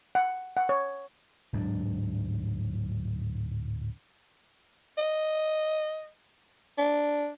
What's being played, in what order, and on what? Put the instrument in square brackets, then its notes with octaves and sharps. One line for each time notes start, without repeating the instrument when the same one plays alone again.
[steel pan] F#5
F#5
C#5
[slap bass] D1 G#2 F#3 D4
[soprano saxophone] D#5
D4